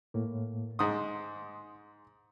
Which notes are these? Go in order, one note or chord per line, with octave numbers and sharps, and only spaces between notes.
A2 A#3
G#2 C6 D#6